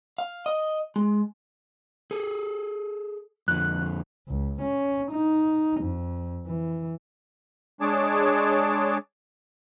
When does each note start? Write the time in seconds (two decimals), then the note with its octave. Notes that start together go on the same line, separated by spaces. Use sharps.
0.18 F5
0.46 D#5
0.96 G#3
2.11 G#4 A4
3.48 F2 D3 F#6
4.29 C#2
4.61 C#4
5.11 D#4
5.81 F2
6.47 E3
7.81 G#3 D4 G#4 C#5 A5 D6